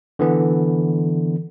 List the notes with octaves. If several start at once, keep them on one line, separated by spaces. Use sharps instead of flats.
D3 E3 B3